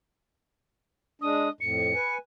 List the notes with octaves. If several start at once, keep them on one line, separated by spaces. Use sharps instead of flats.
G#3 D4 D#6
F2 A2 C#7
B4 G#5